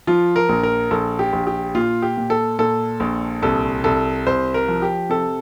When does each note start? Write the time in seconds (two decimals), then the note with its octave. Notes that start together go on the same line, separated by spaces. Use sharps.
0.07 F3 F4
0.36 A#4
0.49 A#1
0.63 A#4
0.91 A#1 A4
1.19 G4
1.33 A#1
1.47 G4
1.75 A#2 F4
2.02 G4
2.17 A#2
2.30 A4
2.59 A#2 A4
3.00 A#1
3.42 C2 A4
3.84 C2 A4
4.27 C2 C5
4.54 A#4
4.68 F3
4.82 G4
5.09 C3 A4